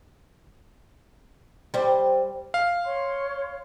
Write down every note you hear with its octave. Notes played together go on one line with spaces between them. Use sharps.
G3 C5
F5
C#5 C6